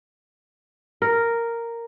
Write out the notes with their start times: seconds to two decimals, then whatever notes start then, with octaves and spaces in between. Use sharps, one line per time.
1.02 A#4